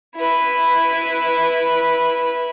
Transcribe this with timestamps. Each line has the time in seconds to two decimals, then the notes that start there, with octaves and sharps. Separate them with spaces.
0.16 E4 B4